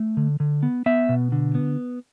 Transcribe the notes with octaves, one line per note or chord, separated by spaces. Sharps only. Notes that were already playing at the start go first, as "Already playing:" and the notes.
Already playing: A3
D3
D3
B3
B3 E5
B2
D3
B3